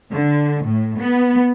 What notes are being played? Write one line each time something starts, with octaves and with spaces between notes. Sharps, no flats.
D3
A2
B3